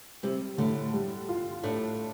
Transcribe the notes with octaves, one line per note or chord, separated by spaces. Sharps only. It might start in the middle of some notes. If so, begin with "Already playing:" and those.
C3 G3 C4
A2 D3 A3
G3
F4
A2 A3 D4